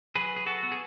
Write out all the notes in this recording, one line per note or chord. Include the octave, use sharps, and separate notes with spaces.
F#3 G#4 B4
G#4
F#4 A4
B3
G#4